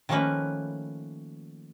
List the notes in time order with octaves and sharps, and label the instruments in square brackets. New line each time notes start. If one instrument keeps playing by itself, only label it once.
[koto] D#3 F3 A3 A#3 C#4 B4